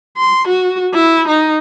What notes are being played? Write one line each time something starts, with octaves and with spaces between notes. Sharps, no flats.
C6
F#4
E4
D#4